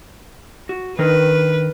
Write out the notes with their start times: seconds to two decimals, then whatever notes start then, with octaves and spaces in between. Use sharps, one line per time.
0.69 F#4
0.99 D#3 D4 A#4 B4